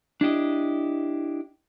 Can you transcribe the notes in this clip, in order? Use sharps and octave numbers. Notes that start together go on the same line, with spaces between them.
D4 E4 G4 D#5